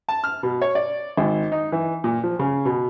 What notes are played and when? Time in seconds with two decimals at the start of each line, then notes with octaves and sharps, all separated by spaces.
0.09 A5
0.24 F6
0.43 B2
0.61 C#5
0.75 D5
1.17 G#1
1.52 D#4
1.72 E3
2.04 A#2
2.23 F3
2.39 C#3
2.65 B2